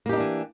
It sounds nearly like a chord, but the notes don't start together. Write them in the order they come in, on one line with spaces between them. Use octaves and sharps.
A#3 G4 D#4 D4 E3